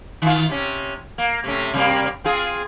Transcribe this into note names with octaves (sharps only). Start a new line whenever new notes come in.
D#3 F4
C3 C#4
A#3
C3 A3 C#4
C3 G3 A#3
C4 F4 G#4